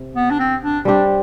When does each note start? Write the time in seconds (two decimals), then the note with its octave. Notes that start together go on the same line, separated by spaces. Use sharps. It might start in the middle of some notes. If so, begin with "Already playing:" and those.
Already playing: C3
0.16 B3
0.30 D4
0.39 C4
0.62 D4
0.85 G3 C4 D4 G4